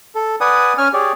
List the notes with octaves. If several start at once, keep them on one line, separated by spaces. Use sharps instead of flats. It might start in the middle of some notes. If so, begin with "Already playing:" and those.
A4
B4 D5 F#5 G#5 D#6
C#4 G#5 F6
G4 G#4 C#5 D5